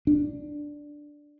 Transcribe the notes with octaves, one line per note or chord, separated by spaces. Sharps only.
D4